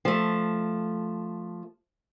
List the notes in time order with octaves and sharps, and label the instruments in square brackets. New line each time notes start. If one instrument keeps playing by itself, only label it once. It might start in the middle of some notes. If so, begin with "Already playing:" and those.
[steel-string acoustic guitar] F3 A3